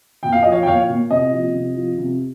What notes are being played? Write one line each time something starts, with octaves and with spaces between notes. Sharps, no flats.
A#2 G5
F5
F3 D#5
C#5 F5
G5
A#2 C#5 F5
A#2
C3 D#5
F3
C3
F3
C3